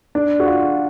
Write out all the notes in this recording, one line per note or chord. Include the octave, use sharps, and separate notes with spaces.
D4
F#4
F4